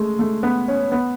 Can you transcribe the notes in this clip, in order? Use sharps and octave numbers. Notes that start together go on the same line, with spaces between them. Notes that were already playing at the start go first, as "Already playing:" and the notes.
Already playing: G#3 A3
A3
B3
C#4
B3